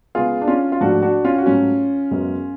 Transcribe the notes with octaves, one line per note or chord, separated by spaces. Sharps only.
C#3 G#3 B3 F4 G#4
D4
C#4 F4
F4
G#2 F3 A3 D4 F#4
D4 F#4
C#4 F4
F#4
G#2 F#3 A3 C#4 F4
F#2 C#3 G#3 B3